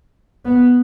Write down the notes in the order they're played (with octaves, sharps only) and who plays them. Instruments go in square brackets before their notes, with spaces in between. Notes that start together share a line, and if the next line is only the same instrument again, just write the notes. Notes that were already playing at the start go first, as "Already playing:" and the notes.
[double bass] B3